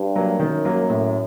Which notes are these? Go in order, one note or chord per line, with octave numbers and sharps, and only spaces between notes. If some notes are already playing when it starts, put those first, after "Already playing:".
Already playing: G2
F#3 A#3
F#2 D#3
F#3 A#3
A2